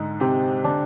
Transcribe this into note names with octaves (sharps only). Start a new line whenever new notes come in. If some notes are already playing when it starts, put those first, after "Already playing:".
Already playing: G#2 D3 D#4
C3 G4 C5
D3 D4